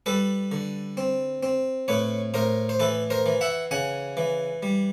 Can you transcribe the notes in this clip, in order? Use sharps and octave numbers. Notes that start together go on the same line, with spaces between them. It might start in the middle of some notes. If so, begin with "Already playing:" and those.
G3 A4 B4
D3
C4
C4
A2 B4 C#5
A2 A#4 C5
C5
E3 A4 B4
A#4 C5
E3
E5 F#5
C#3 F#5 G#5
E3
G3